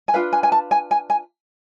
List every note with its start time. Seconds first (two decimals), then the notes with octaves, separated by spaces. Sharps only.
0.08 G#5
0.14 D4 F4 B4 F5
0.33 G#5
0.43 G#5
0.52 A5
0.71 G#5
0.91 G#5
1.10 G#5